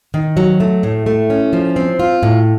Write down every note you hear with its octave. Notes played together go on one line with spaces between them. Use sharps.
D#3
F#3
A3
A2
A3
C#4
F3
C4
F4
A2